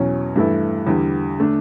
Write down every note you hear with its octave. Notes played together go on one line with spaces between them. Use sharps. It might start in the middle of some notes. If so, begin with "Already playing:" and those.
Already playing: E2 B2 F#3 C#4
G2 E3 A3 E4 A4
E2 D3 G3
D3 A3 D4